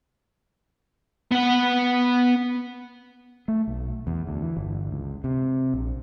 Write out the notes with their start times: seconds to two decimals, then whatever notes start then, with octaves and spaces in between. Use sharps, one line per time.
1.31 B3 F#5
3.48 A3
3.67 B1
4.07 E2
4.27 D2
4.42 E3
4.57 G1
4.91 C#2
5.24 C3
5.74 A#1